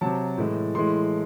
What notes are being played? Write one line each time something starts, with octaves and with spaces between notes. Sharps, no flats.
C3 F#3 A5
A2 E3 G#3
A2 E3 G#3 C6